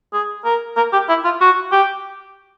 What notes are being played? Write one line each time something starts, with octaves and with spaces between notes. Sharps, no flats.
G#4
A#4
A#4
G4
E4
F4
F#4
G4